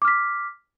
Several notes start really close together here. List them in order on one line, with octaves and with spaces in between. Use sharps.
D6 F6 B6